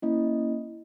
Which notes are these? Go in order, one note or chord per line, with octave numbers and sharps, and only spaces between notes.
A#3 C#4 E4 D#5